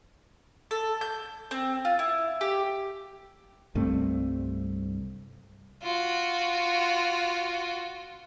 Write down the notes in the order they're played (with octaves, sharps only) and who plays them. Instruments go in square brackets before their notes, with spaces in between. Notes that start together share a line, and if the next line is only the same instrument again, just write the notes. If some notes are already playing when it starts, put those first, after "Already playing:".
[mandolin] A4
G6
C4
F4
E4
G4
[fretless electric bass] C2 G2 A3 C4
[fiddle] F4 F#4